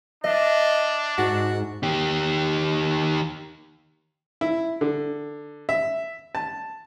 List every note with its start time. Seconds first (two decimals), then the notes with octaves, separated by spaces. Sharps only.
0.24 D4 D#5 E5
1.18 G#2 F#4
1.83 D#3 G4
4.41 E4
4.81 D3
5.69 E5
6.35 A5